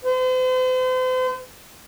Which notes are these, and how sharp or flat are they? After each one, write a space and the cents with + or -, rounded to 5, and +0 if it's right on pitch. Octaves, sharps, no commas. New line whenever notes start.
C5 -40